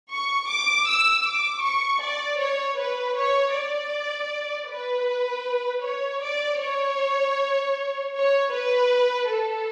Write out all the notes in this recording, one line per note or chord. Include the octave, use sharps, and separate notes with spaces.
C#6
D6
E6
D6
C#6
D5
C#5
B4
C#5
D5
B4
C#5
D5
C#5
C#5
B4
A4